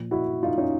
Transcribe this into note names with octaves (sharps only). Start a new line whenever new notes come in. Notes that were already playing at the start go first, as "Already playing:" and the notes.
Already playing: A#2 F3
E4 F#4
D#4 F4
C#4 D#4